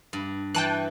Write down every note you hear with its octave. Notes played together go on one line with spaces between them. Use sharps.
G2
E3 G5 A5 F#6